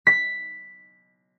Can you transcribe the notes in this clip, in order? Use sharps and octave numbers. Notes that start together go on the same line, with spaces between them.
B6